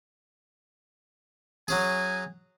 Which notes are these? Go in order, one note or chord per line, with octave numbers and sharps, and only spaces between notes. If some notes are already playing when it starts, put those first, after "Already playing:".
F#3 C#4 G#4 G#5